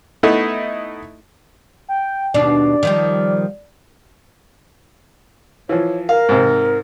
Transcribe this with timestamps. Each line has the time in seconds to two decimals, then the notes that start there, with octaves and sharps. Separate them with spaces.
0.23 A3 B3 D#4 E4
1.89 G5
2.34 D#2 B2 D4 D5
2.83 D#3 F3 G3
5.69 E3 F3 C#5
6.09 A#4 F5
6.29 G#2 C3